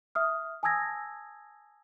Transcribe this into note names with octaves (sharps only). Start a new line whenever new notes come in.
E5 D#6 F6
G#5 A5 D#6 E6 G#6 A#6